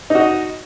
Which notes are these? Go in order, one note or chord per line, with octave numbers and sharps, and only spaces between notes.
D#4 F#4 D#5